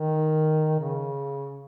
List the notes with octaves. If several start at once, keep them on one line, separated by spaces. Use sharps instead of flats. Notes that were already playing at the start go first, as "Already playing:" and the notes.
Already playing: D#3
C#3